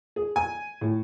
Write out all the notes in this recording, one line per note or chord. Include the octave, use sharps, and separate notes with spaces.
G#4
G#5
A2